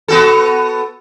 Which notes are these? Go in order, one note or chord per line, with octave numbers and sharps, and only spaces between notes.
B3 F#4 A4